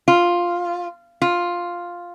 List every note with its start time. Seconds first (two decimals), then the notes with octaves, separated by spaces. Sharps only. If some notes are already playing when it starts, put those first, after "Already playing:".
0.08 F4
1.22 F4